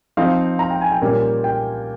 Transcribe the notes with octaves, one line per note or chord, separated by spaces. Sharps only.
F3 C4 D#4 F5
A#5
G5
G#5
G5
A#2 G3 A#3 C#4
G5